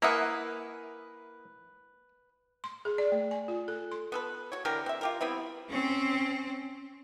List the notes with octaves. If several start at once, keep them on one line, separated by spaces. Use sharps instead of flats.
A#3 E4 A#4 B4 E5 F#5 G#5 D#6
C6
G#4
D5
A3
G#5
F4
A4
C6
B3 A4 B4
F#4 C#5
D3 E3 G4 A#4
C4 E5
F4 G4 A#4
G3 B3 C4 E4
C4 C#4